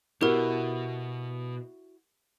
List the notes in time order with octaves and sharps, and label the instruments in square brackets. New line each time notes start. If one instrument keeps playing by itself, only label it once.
[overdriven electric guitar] B2 [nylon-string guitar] E4 F#4 [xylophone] G4 A#4